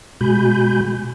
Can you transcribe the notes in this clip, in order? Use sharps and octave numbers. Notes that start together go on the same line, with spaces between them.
B2 G#3 F#4 G#5 B5 G6